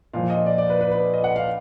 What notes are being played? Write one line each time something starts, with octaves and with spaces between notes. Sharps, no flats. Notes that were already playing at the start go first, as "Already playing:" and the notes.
A#2 F3 F5
D#5
D5
D5
B4
B4
B4
D#5
F#5
F5